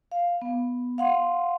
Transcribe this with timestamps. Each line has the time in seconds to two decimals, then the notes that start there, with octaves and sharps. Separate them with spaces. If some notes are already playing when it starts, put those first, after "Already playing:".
0.12 F5
0.42 B3
0.98 F5 F#5 C6